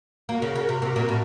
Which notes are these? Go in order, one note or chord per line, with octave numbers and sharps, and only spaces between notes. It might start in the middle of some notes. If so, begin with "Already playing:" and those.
A#3 F#4 A#4
C#3
C#3
C3
C3
A#2
A2